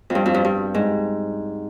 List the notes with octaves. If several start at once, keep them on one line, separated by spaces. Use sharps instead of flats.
F2
G2
F2
G2
G2
G#2